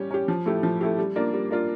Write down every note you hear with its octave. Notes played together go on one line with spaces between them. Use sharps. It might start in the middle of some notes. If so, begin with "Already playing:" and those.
Already playing: G3 C#4 G4
C#4 G4
F3
A3 E4 G4
F3
A3 E4 G4
G3
A#3 D4 F4
G3
A#3 D4 F4